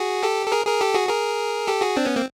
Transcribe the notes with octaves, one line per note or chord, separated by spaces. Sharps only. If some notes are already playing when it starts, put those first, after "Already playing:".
Already playing: F#4 G#4
G4 A4
A4
G#4 A#4
G#4 A#4
G4 A4
F#4 G#4
G#4 A#4
G4 A4
F#4 G#4
C4 D4
B3 C#4
A#3 C4